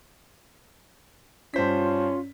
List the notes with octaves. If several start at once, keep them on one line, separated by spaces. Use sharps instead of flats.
G2 C#4 F4 C5 B6